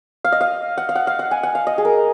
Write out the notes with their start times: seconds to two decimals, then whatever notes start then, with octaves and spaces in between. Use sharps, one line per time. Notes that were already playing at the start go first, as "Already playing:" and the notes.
0.24 F5
0.32 D#5
0.41 F5
0.78 F#5
0.89 F5
0.95 F#5
1.07 F5
1.19 F#5
1.31 G#5
1.43 F#5
1.55 F5
1.67 D#5
1.78 G#4
1.85 A#4